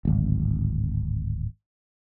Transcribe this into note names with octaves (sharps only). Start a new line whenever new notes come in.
D1 G#1